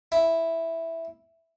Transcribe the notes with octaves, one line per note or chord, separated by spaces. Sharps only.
E4